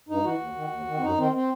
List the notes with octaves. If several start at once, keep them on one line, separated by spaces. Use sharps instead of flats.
G2 D#4
E3 F#4
D#2
D#3
D#2
D#3
C4
F#2 D#4
D#3 C4
C4